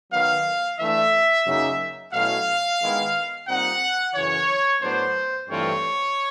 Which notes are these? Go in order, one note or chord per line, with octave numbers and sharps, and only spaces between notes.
D#3 F#3 B3 F5
E3 A3 D4 E5
F#2 C#3 F#3 A#3 D#4
B2 F#3 A3 C#4 E4 F5
D#3 G#3 B3 E4
A#2 G3 C4 D#4 F#5
F#2 C#3 E3 C#5
A2 F#3 B3 D4 C5
G2 E3 A3 C4 F4 C#5